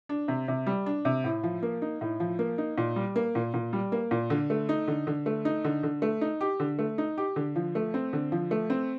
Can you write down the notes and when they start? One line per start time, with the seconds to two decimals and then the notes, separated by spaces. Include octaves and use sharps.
0.09 D4
0.28 C3
0.48 C3
0.66 G3
0.86 D4
1.05 C3
1.24 A2
1.43 F3
1.63 A#3
1.82 D#4
2.01 A2
2.20 F3
2.39 A#3
2.58 D#4
2.78 A#2
2.96 G3
3.16 A#3
3.35 A#2
3.54 A#2
3.73 G3
3.92 A#3
4.11 A#2
4.30 D3
4.50 A3
4.69 D#4
4.88 D3
5.07 D3
5.26 A3
5.45 D#4
5.65 D3
5.83 D3
6.02 A3
6.21 D#4
6.41 G4
6.60 D3
6.79 A3
6.98 D#4
7.18 G4
7.36 D3
7.56 F3
7.75 A3
7.94 C4
8.13 D3
8.32 F3
8.51 A3
8.70 C4